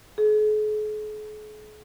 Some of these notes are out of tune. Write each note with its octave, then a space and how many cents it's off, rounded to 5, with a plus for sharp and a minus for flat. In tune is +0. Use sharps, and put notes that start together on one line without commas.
G#4 +45